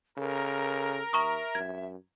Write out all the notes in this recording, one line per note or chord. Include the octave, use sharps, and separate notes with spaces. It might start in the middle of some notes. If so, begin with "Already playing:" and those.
C#3 A4 A#4
D#2 E5 A#5 C#6 D#6
F#2 G#6